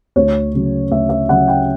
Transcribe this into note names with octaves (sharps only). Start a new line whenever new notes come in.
D2 C#5
C#3 F#3
D2 E5
E5
C#3 F#3 F#5
G5